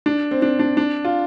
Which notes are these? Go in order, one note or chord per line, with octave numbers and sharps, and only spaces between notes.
D4
C4
D4
D4
D4
F4